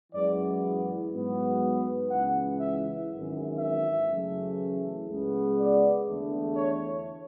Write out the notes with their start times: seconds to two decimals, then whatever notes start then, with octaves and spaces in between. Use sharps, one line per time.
0.12 F#2 E3 G#3 B3 D5
1.12 G#2 F#3 B3
2.10 C#2 C#3 E3 F#5
2.60 E5
3.09 G#1 F#2 E3
3.58 E5
4.08 F#2 C#3 E3 A3
5.07 C#2 C#3 G#3 B3
5.57 D5
6.06 E2 D3 A3
6.55 C#5